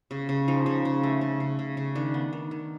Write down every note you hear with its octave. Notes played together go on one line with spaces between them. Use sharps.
C#3
C#3
F3 D#4
C#3
C#3
A3
C#3
C#3
C#3
C#3
D#3 D4
B3
D#3
D#3